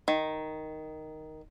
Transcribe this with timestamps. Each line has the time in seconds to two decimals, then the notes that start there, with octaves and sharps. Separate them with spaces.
0.08 D#3